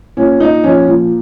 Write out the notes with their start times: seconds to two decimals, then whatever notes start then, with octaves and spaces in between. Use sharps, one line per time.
0.17 A#2 C#4
0.40 A#2 D#4
0.64 F3 C#4
0.87 A#2